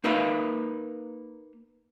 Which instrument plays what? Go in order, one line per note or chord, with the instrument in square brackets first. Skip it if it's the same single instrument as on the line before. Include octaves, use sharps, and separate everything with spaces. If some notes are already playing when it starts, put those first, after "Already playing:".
[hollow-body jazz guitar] A#3 D#4 A#4 B4 E5 F5